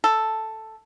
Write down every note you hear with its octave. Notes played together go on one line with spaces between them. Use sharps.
A4